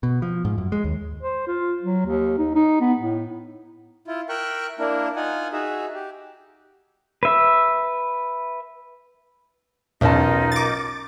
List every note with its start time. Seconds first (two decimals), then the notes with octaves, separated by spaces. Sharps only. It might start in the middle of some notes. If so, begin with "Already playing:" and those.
0.03 B2
0.22 F3
0.45 G#2
0.58 F#2
0.72 G#3
0.84 D#2
1.21 C5
1.47 F4
1.83 F#3
2.06 D#2
2.38 D#4
2.55 D#4
2.81 B3
2.99 A2
4.07 E4 F4
4.29 A#4 E5 G5 C#6 F#6
4.79 A#3 D4 E4 A#4
5.16 D#4 F4 F#5 G#5
5.53 D#4 F#4 G#4 E5
5.94 G4
7.23 B4 E5
10.01 B1 E2 C#4 D#4 F4 A#4 A5
10.52 D6 A6